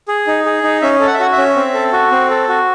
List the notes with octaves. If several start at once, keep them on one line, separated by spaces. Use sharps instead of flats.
G#4
D#4
G#4
D#4
C#4 E5
A4
F#5
E5
F#4 F#5
E5
C#4
C4
A4
F#4
C4
A4
F#4